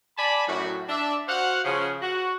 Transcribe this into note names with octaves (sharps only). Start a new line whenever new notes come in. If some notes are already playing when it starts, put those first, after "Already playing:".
D5 G#5 A5 B5
F#2 A2 F#4
D4 E5
F#4 C5 F5 F#5
C#3 F3
F#4